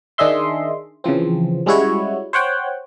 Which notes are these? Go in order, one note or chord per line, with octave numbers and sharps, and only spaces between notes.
D#3 D4 G#4 D#5 E5 C6
C#3 E3 F3 C4
G3 G#3 C#4 E4 F#4 C#5
C5 C#5 F#5 G5